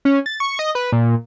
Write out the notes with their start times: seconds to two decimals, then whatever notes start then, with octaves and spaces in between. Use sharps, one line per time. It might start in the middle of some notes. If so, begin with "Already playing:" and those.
0.05 C#4
0.26 A6
0.40 C#6
0.59 D#5
0.75 B4
0.92 A#2